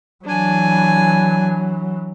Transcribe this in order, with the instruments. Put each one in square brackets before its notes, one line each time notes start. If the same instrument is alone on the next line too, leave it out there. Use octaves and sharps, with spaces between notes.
[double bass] E3 F#3 [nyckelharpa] D4 G#5